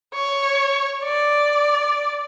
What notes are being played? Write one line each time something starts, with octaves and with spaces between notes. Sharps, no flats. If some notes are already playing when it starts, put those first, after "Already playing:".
C#5
D5